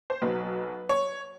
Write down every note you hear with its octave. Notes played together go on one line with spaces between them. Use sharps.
C5
B1 B2 F#3 B3 B4
C#5